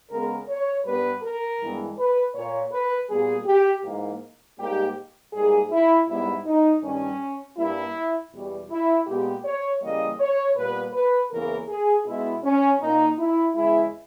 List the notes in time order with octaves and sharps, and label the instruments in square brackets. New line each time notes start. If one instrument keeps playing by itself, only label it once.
[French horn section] C#3 G#3 B3 A#4
C#5
G2 G3 B3 B4
A#4
G2 E3 G#3 B3
B4
A#2 A#3 C#5
B4
A#2 G3 B3 G#4
G4
G#2 E3 A#3
G#2 G3 A#3 G4
G#2 G3 A#3 G#4
E4
G#2 G3 B3 E4
D#4
G2 D#3 G3 C#4
G2 G3 A#3 E4
E2 B2 G3
E4
A#2 G#3 B3 G4
C#5
C#3 E3 G3 A#3 D#5
C#5
A#2 G3 B3 B4
B4
E2 C#3 E3 A#3 A#4
G#4
B2 G#3 B3 E4
C#4
A#2 A#3 D#4
E4
E2 C#3 G#3 E4